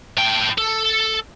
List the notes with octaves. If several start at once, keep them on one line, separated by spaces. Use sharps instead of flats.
A2 G5
A4